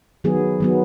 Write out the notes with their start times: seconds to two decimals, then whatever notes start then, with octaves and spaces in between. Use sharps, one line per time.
0.24 D#3 F#3 B3 G#4
0.60 D#3 F#3 B3